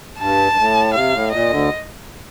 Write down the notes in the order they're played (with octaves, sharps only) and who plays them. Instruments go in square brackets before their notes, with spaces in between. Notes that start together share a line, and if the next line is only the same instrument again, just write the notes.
[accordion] G2 [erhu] A5
[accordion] G2
A2
[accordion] C3 [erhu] F5
[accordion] A2
[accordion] A#2 [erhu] D#5
[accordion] D2 D3